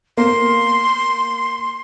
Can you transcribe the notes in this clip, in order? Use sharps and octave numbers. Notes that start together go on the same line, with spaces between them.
A#3 C6